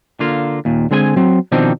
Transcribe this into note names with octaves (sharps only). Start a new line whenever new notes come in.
D3 A#3 F4
D#2 A#2
D3 G#3 C4 G#4 G5 G#5
F#3 C4
B2 D#3 F3 C4 D4 D#4